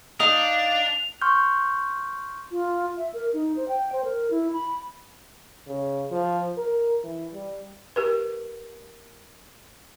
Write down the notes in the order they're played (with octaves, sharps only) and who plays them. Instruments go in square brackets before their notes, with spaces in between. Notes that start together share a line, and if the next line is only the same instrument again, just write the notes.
[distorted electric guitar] D4 [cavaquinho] D#4 F5 D#6 [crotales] F7
[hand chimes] C6 C#6 F6 G6
[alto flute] F4
E5
A#4
D#4
C5
G5
C5
A#4
E4
B5
[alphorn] C#3
F3
A#4
E3
G3
[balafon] G4 A#4 B4